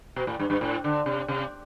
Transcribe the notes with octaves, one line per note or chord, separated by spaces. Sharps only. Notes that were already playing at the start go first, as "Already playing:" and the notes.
B2
A2
G2
G2
A2
D3
C3
C3